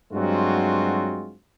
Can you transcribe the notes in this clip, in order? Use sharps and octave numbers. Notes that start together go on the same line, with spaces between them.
G2 F#3 G#3 C4 F4 F#4